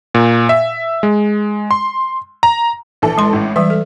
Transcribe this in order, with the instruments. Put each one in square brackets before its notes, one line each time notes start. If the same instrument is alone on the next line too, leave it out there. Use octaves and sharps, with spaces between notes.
[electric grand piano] A#2
E5
G#3
C6
A#5
[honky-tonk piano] A#1 E3 A4
[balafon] G#3 C6
[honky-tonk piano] A1 A2
[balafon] E3 G3 [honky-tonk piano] E5
[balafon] A4